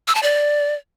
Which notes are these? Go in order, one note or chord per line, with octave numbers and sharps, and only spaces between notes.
E6
A5
D5